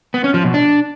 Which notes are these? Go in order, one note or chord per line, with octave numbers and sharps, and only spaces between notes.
B3
C#4
F3
B2
D4